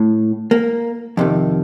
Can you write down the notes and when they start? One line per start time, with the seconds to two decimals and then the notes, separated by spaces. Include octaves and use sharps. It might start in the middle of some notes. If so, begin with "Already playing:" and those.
Already playing: A2
0.51 A#3
1.17 F2 C3 D#3